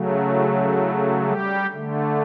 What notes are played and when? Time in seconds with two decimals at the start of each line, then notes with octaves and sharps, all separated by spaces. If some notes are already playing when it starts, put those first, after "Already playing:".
Already playing: C#3 F#3 A3
0.31 E4
0.77 E4
1.24 G3 G4
1.70 D3 A3